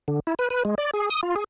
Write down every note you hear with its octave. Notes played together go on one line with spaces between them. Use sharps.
D3
E4
B4
B4
G#3
D5
G#4
D#6
F4
G#4